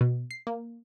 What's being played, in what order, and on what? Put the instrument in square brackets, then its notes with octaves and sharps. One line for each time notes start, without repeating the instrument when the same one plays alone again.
[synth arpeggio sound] B2
C7
A#3